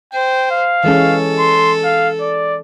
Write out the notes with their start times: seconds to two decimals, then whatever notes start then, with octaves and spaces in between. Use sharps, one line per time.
0.13 C5 G5
0.51 F5
0.84 E3 G#3 C#4 A4
1.39 C6
1.84 F5
2.21 D5